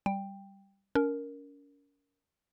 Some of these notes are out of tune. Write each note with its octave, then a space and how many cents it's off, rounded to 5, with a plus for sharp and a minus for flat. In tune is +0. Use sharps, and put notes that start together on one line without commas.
G3 +0 G5 +10
C#4 +40 A#4 +0